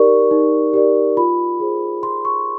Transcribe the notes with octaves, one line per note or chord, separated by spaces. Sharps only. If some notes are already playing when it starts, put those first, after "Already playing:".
Already playing: D#4 G4 A#4 D5 C#6
D#4
G4 A#4 D5
F4 B5
G#4 C5
F4 C6
C#6